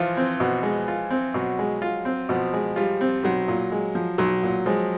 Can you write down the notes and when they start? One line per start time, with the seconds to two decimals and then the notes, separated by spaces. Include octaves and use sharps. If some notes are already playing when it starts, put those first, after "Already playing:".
Already playing: E3 F3 F4
0.17 C4
0.40 B2
0.63 G#3
0.88 F4
1.10 C4
1.34 B2 F#3
1.59 G#3
1.82 F4
2.05 C4
2.29 B2 F3
2.53 G#3
2.76 G3 F4
3.01 C4
3.23 B1 F#3
3.48 A#2
3.72 G#3
3.95 F3
4.18 B1 F#3
4.43 A#2
4.66 F3 G#3